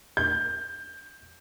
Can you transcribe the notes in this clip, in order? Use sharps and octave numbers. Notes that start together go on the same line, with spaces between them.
G6